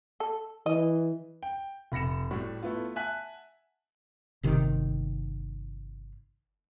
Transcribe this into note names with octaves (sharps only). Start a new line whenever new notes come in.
A4
E3 D#5
G5
F1 B5 A#6 C#7 E7
A2 G3 F#4
A3 B3 E4 F4
E5 F#5 G#5 A5 F#6 B6
G1 C3 D#3